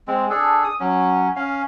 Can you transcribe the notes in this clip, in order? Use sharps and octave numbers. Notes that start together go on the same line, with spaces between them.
G#3 C4
D4 G#4 A4
D#6
F#3 C#4
C#4 F5